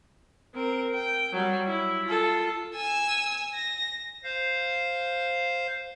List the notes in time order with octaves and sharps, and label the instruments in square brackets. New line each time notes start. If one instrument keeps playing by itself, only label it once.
[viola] C4 A#4
G5
F#3 G3
E4
F4 A4
[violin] G#5 E6
A#6
[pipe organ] C5 F5